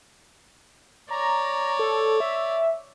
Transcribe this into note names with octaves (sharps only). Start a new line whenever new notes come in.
C#5 D5 A#5
A4
E5